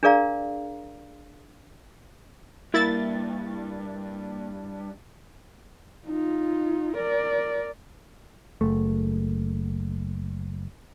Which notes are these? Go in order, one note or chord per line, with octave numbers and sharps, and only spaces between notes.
D4 G#4 A#4 D5 F5 A#5
G2 A#3 E4 A6
D#4 F4
A#4 D5
F#1 A3